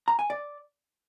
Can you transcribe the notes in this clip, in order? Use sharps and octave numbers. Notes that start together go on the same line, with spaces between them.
A#5
G#5
D5